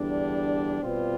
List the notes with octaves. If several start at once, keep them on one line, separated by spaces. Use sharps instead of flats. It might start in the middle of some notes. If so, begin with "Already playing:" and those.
Already playing: E2 D3 G3 D4
B2 G3 C4 F4 B4